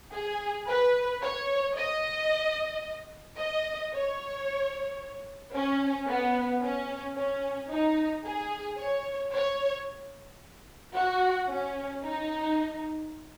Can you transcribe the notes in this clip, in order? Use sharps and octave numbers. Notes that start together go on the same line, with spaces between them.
G#4
B4
C#5
D#5
D#5
C#5
C#4
B3
C#4
C#4
D#4
G#4
C#5
C#5
F#4
C#4
D#4